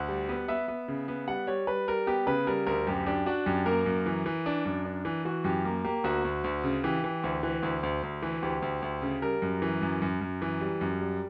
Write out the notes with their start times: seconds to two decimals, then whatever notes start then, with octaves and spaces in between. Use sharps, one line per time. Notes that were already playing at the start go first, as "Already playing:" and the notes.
Already playing: D2 F#5
0.09 G3
0.29 B3
0.48 B3 E5
0.68 B3
0.88 C#3
1.08 B3
1.27 G3 F#5
1.47 G3 C#5
1.67 G3 B4
1.88 G3 A#4
2.07 B3 G4
2.27 C#3 B4
2.47 G3 A#4
2.67 D2 A#4
2.87 F#2 G4
3.07 D4 G4
3.26 D4 F#4
3.46 F#2 G4
3.66 A#3 A#4
3.86 F#2
4.06 E3
4.26 E3
4.46 D4
4.65 F#2
4.85 D4
5.05 E3
5.25 E3 F#4
5.44 F#2 G4
5.65 A#3
5.85 A#3 G4
6.04 D2 F#4
6.25 D2
6.44 D2
6.64 C#3
6.84 E3 G4
7.04 E3
7.24 D2
7.43 E3
7.63 D2
7.83 D2
8.03 D2
8.22 E3
8.42 D2 G4
8.62 D2
8.82 D2
9.02 C#3
9.22 G3 A#4
9.42 F#2
9.62 E3
9.82 F#2
10.02 F#2
10.21 F#2
10.42 E3
10.61 G3
10.81 F#2
11.01 G3